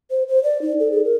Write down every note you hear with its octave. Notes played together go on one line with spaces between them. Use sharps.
C5
C5
D5
D#4
A4
G#4
A#4